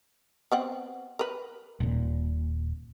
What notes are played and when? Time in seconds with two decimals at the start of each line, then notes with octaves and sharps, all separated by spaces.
0.52 B3 C4 F#5
1.19 A#4 B4
1.80 D#1 A#2